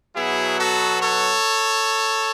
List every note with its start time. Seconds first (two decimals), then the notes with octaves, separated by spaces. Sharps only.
0.15 B2 F#3 B3 E4 G#4
0.59 F#4 A4
1.01 A4 C#5